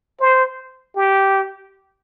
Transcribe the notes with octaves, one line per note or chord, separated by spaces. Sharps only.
C5
G4